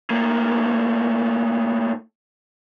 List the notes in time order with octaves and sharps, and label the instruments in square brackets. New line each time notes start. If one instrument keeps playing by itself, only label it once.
[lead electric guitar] A2 A#3